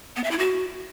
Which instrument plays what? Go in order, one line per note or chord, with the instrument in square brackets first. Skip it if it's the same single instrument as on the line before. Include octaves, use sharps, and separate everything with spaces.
[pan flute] B3
E5
E4
F#4